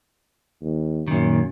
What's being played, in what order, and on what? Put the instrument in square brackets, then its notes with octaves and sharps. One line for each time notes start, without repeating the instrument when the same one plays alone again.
[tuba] D#2
[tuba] F#2 [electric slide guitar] A#2 D#3